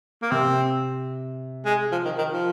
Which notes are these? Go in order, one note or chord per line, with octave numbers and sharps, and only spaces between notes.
A#3
C3 C4
G#3
F3
D#3
D#3
F3